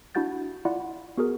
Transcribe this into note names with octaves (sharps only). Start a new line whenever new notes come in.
D4 E4 F#4 F#5 G6 A6
E4 F4 D5 F#5
B3 F#4 G#4 A#4